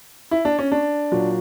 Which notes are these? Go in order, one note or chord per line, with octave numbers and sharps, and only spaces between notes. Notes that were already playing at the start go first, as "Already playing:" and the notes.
E4
D4
C#4
D4
A#2 F#3